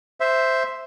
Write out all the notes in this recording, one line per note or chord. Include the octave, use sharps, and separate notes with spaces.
C5 E5